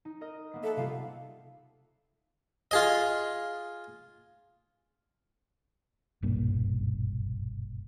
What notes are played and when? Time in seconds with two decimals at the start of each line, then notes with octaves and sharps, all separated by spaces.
0.05 D#4
0.21 A#4 D#5
0.51 A#3 B3 C7
0.63 A4 E5 F#5
0.76 C3 G3 F4 F5
2.71 F4 G#4 D#5
6.22 F#1 B1 G2 A#2